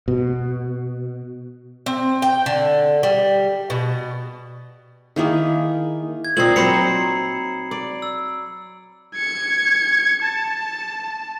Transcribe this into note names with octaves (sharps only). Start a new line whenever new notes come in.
B2
C4
G5
D3
G3
B2
D#3 A#3 E4 G#4
G#6
A#2 C4 D#4 C7 F#7
F#3 C4 C5 A#5 B5 C#7
D5
E6
G#6 C#7
A5